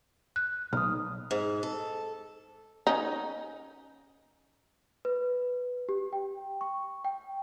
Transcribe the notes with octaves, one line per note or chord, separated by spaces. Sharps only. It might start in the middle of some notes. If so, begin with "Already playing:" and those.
F#6
B1 D#6 F6
G#2
A4
C#4 D#4
B4
G4
G5
C#6
G5